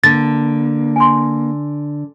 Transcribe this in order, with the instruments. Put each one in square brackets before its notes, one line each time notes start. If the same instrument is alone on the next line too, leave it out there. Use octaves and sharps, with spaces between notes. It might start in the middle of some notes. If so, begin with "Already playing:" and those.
[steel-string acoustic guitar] D3 [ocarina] A#3 [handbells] A6
[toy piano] G#5 C6